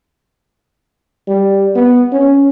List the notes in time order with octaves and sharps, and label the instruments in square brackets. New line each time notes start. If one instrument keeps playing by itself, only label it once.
[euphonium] G3
B3
C#4